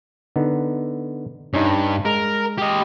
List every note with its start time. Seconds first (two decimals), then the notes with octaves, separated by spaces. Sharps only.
0.36 D3 B3 D#4
1.54 G2 C#4 D#4
2.05 G#3 A#4
2.59 G4 D#5